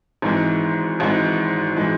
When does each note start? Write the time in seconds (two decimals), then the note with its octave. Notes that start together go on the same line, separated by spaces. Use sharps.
0.22 G#1 G#2 E3 G#3
1.00 G#1 G#2 E3 G#3
1.76 E3 G#3